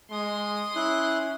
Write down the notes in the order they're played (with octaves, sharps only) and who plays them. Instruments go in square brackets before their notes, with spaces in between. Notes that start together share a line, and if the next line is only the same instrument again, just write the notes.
[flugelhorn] G#3 [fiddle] C6 D#6
[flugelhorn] C#4 [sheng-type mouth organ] E4 F#6